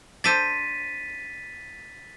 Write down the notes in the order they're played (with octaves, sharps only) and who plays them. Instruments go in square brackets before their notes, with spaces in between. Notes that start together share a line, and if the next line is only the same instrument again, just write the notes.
[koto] D4 A4 C5 [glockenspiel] A6 B6 D#7